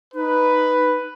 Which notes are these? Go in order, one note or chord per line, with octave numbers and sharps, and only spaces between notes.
D#4 B4